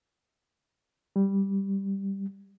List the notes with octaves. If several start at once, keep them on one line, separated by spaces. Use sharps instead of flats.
G3